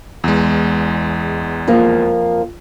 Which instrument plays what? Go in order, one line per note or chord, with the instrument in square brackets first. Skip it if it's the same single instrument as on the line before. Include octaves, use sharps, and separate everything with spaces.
[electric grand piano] E2 G#3
[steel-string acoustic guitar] F2 F3 A#3